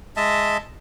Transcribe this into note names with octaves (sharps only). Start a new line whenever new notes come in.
G#3 D#5 E5 A5